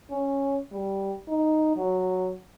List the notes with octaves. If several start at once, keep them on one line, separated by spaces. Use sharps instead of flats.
C#4
G3
D#4
F#3